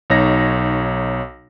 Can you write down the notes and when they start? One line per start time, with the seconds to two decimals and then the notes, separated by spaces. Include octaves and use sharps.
0.10 B1 D#4 C#5 A#6